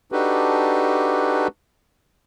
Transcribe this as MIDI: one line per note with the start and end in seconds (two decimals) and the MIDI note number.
0.12 1.48 62
0.12 1.48 63
0.12 1.48 66
0.12 1.48 67
0.12 1.48 69
0.12 1.48 71